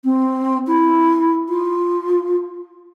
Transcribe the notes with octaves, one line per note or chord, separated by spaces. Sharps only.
C4
E4
F4